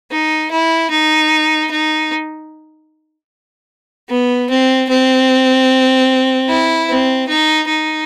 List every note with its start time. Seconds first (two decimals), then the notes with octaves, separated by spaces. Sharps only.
0.11 D#4
0.51 E4
0.90 D#4
1.71 D#4
4.09 B3
4.50 C4
4.89 C4
6.48 E4
6.89 C4
7.28 D#4
7.69 D#4